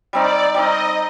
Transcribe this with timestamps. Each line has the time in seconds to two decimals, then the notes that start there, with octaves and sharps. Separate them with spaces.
0.13 G3 C4 D#4 D5
0.54 G3 C4 D#4 D#5